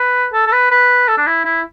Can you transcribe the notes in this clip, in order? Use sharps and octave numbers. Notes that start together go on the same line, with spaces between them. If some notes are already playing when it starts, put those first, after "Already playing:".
Already playing: B4
A4
A4
B4
B4
A4
D4
E4
E4